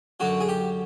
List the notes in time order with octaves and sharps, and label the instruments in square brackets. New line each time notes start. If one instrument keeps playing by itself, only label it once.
[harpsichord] F#2 D3 F#3 F#4
G#4
G4